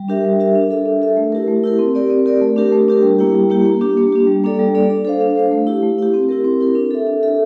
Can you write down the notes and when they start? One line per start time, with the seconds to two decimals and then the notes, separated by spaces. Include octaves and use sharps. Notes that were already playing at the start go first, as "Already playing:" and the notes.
Already playing: G3
0.08 D4 G4 A#4 E5
0.25 G3
0.40 D4 G4 A#4 E5
0.55 D4
0.71 A4 E5
0.86 D4
1.02 A4 E5
1.17 A3
1.32 E4 G4 A#4
1.48 A3
1.63 E4 G4 A#4
1.79 C4
1.95 G4 A#4 D5
2.10 C4
2.26 G4 A#4 D5
2.41 A3
2.56 D4 G4 A#4
2.72 A3
2.88 D4 G4 A#4
3.03 G3
3.19 A#3 E4 G4
3.34 G3
3.50 A#3 E4 G4
3.66 A#3
3.81 D4 G4
3.97 A#3
4.12 D4 G4
4.27 G3
4.44 A#3 D4 A4 D5
4.59 G3
4.74 A#3 D4 A4 D5
4.90 D4
5.05 A4 C5 F5
5.21 D4
5.36 A4 C5 F5
5.51 A3
5.67 E4 G4
5.83 A3
5.98 E4 G4
6.14 C4
6.29 E4 G4 A#4
6.45 C4
6.60 E4 G4 A#4
6.75 D4
6.91 A4 E5
7.07 D4
7.23 A4 E5